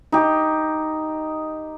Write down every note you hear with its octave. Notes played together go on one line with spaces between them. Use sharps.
D#4 G4